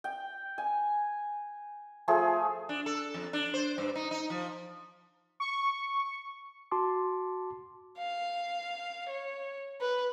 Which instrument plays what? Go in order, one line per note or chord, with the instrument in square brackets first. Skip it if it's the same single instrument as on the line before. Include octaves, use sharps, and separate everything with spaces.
[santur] G5
G#5
F3 A3 G#4
[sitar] D4
A4
F2
D4
C5
G2
D#4
D#4
F3
[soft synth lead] C#6
[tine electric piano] F#4 A5 C6 D6
[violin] F5
C#5
B4